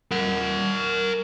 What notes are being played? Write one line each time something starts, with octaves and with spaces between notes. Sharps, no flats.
A#4 F#5